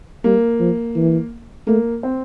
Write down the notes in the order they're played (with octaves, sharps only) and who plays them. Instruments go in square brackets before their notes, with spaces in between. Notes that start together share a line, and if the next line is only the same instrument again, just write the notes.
[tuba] G3 [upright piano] A#3
[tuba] F3
E3
[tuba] A3 [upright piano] A#3
[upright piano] C4